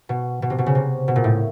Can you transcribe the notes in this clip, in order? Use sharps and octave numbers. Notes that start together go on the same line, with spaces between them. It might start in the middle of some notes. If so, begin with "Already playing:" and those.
B2
B2
C3
B2
C#3
C3
B2
A#2
A2